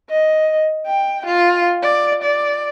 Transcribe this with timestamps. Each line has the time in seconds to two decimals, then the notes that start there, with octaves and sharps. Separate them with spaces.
0.10 D#5
0.86 G5
1.26 F4
1.83 D5
2.23 D5